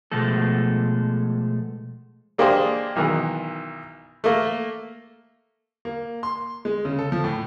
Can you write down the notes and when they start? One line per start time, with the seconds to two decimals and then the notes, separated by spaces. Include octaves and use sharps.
0.12 B2 F3 G#3 A3 A4
2.38 G#3 A#3 D4 G4 G#4 C5
2.96 B1 D#3 E3
4.24 A3 A#3
5.85 A#3
6.23 C6
6.65 G#3
6.85 C#3
6.98 A4
7.12 F3
7.24 A2